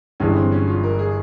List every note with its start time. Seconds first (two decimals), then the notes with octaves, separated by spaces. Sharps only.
0.20 G1 G2 E3 G#3 C#4
0.36 C4
0.52 C#4
0.67 F4
0.83 A#4
0.99 G#4